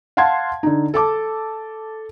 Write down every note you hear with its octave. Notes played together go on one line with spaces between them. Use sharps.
F5 F#5 A5 C6 G#6
D3 D#4
A4 A5 D6